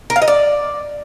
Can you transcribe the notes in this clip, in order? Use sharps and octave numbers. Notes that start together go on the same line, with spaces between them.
A#4
F5
D#5
D5